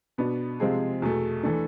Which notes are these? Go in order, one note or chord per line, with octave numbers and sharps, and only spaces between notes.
B2 B3 D4
C3 F3 G#3 C4 G#4
E2 B2 A3
E3 A3 D4